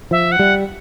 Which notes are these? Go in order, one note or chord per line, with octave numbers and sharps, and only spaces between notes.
F3 E5
F#5
G3